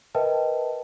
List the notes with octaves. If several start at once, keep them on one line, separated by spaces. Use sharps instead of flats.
A#4 B4 D#5 E5 G5 A5